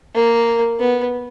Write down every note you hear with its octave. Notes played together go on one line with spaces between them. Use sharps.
A#3
B3